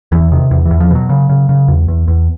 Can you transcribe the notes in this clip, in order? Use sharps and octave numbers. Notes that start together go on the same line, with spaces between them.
E2 E3
C3 D#3
E2
E3
E2
F3
B2 F#3
C#3
C#3
C#3
E2
E2
E2